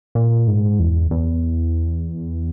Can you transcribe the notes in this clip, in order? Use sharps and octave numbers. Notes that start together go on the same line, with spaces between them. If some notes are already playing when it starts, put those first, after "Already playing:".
A#2
G#2
E2
E2